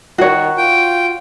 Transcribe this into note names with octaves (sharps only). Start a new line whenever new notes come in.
D#3 F#4 C#5
F4 G5